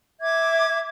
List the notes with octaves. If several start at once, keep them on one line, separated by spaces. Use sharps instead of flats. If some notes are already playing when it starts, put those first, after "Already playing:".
E5 D6 G#6